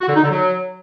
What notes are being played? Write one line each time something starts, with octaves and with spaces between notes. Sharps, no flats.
F#4
D3
D#4
D3
F#3